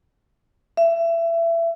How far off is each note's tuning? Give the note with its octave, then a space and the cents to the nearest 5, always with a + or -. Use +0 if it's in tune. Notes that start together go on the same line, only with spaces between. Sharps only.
E5 +25